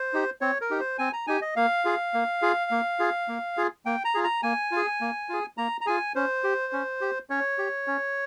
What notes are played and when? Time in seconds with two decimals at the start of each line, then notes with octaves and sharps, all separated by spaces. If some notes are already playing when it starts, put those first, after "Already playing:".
Already playing: C5
0.13 D#4 G4
0.41 C4 C#5
0.61 A#4
0.70 D#4 G4
0.80 C5
0.98 C4 G#5
1.13 A#5
1.27 D#4 G4 G#5
1.42 D#5
1.56 A#3 F5
1.85 F4 G#4
2.14 A#3
2.42 F4 G#4
2.71 A#3
2.99 F4 G#4
3.28 A#3
3.57 F4 G#4
3.86 A#3 G5
4.05 A#5
4.14 F4 G#4
4.24 A#5
4.43 A#3 G#5
4.71 F4
4.76 G#4
5.01 A#3
5.29 F4 G#4
5.57 A#3 A#5
5.81 A#5
5.86 F4 G#4 G#5
6.15 C#4 C5
6.44 G4
6.73 C#4
7.01 G4
7.30 C#4 C#5
7.58 G4
7.87 C#4